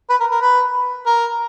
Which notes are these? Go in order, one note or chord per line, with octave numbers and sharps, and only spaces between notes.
B4
A#4
A#4
B4
A#4